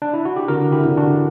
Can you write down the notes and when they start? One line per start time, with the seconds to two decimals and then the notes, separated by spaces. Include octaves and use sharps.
0.02 D4
0.14 E4
0.25 F#4
0.36 G4
0.48 D3 F#4 A#4
0.72 E4 G4
0.85 D3
0.97 D4 F#4